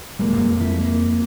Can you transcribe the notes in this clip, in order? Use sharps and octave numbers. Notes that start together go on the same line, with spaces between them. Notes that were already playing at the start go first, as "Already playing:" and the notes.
D#1 G3 G#3 A#3
F2 C4
F3 E4
A#3